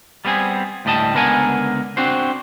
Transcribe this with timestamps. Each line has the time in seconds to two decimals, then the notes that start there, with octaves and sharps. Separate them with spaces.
0.25 G3 B3 C4 G4 G#4
0.85 D2 A2 G3 D#5 A5
1.14 C#2 D3 B3 A#4 F#5 G#5
1.97 C4 D4 F#4 C5